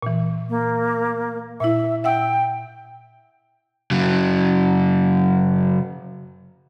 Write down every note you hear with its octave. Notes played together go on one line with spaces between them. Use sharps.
A#2 E3
A#3
A#2 E4 E5
E5 F#5 G5 E6
C#3 F#3